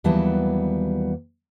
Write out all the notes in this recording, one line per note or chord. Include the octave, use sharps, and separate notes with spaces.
D#2 E3 F#3 G3 B3 A5